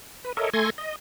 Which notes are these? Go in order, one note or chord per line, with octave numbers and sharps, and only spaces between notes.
B4
A4 A#4 C#5 D#5 E5
A3 A4 G#5 C6 G#6 A#6
D#5